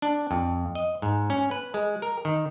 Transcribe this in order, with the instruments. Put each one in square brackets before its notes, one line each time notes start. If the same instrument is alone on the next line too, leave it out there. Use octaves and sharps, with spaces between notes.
[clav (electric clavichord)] D4
F2
D#5
G#2
C#4
B4
G#3
A#4
D#3